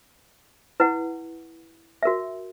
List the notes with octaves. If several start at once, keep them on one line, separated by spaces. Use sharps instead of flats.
E4 B4 F#5
F#4 A#4 E5